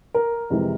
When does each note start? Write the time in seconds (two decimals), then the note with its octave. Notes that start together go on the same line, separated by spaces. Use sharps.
0.14 A#4
0.50 F2 C3 E3 G#3